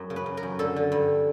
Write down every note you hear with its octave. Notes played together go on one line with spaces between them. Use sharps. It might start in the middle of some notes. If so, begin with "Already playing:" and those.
Already playing: F#2
C#3
B4
F#2
A#4
F#2
D3 A4
D3
G2